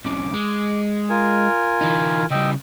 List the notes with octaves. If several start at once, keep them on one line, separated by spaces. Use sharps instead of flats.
B1 C#3 D6
G#3
F4 A#4 G#5
E3 D#4
C#3 G3 D#5 G5 E6